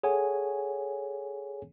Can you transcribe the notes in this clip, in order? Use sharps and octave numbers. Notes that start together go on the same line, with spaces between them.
G#4 A4 C#5 F#5 G#5